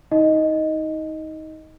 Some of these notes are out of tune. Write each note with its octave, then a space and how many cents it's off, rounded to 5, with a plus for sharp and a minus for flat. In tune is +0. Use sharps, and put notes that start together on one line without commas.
D#4 +25 D#5 +0